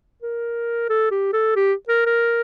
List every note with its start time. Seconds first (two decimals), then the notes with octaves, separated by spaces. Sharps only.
0.22 A#4
0.89 A4
1.11 G4
1.33 A4
1.56 G4
1.89 A#4
2.06 A#4